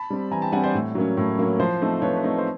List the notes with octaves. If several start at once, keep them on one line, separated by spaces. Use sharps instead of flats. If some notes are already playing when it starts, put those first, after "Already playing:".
Already playing: A5 B5
G3 C4
E3 G#5 A#5
G5 A5
G3 C4 F#5 G#5
C5 D5
A2
F#3 A#3 C#4
A2
F#3 A#3 C#4
F3 C5
A3 C4 D#4
F3 B4 C#5
B4
A3 C4 D#4
C5